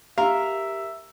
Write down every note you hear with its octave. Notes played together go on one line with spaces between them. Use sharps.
G4 A#4 E5 F5